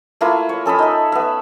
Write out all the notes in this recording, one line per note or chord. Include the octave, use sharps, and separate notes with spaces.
A3 A#3 E4 F4
C#5
C#4 A4 D#5 B5
D#4 E5
B3 E5